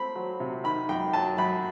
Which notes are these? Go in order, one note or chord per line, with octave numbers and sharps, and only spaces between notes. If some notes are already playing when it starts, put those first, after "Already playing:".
Already playing: A3 C4 B5
F#3
C3
D#3 B5
F#2 G5
F#3 A5
F#2 B5